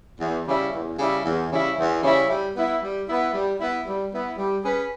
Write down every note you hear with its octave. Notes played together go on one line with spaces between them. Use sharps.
E2
C#3 G3 C#4 E4
E2
C#3 G3 C#4 E4
E2
C#3 G3 C#4 E4
E2
C#3 G3 C#4 E4
G3
B3 E4
G3
B3 E4
G3
B3 E4
G3
B3 E4
G3
C#4 G#4 B4